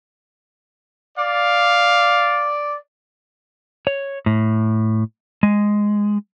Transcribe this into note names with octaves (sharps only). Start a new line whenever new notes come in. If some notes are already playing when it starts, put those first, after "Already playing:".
D5 F5
C#5
A2
G#3